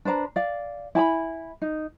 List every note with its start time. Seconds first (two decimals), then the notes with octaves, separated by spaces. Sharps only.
0.05 D4 B4 C5 A#5
0.36 D5 F5
0.95 E4 G#5 A5 B5
1.62 D#4